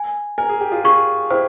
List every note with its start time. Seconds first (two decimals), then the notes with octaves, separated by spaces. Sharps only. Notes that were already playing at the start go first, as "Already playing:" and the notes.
Already playing: G#5
0.38 A#4 G#5
0.49 G#4
0.60 G4
0.72 F4 G#4
0.84 F4 G#4 C#6
1.31 E4 G4 C5